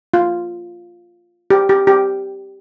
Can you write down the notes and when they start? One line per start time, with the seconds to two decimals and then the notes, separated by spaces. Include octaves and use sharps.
0.14 F4
1.50 G4
1.69 G4
1.87 G4